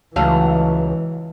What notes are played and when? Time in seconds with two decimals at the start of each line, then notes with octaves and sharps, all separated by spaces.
0.16 C#2 E3 F#3 A3 F5